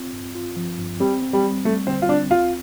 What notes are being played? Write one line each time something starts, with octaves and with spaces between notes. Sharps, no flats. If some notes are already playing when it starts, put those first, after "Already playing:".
Already playing: C4 F4
G2
F4
F3
G2
G3 C4
C4
G3
G3
G3 A3
D3 C4
F4
C4 D4
D2 F4